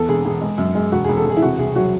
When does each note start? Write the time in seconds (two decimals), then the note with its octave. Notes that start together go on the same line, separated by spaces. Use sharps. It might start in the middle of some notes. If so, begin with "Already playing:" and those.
Already playing: E2 A4
0.09 E1 G#4
0.25 E1 G#4
0.41 G#3
0.58 F#2
0.75 G#3
0.92 E1 F#4
1.04 G#4
1.09 E1
1.17 A4
1.25 E1 G#4
1.37 E4
1.42 C3 F#4
1.59 C2 G#4
1.76 F#3 F#4